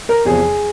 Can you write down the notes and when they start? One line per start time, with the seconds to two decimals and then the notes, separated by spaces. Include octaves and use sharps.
0.09 A#4
0.25 E2 C3 F3 G#4